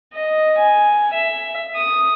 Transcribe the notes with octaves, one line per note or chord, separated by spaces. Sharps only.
D#5
G#5
E5
D#6